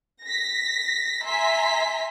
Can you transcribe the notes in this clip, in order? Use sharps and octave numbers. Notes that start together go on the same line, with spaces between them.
A#6 B6
E5 G#5 A#5 C6 B6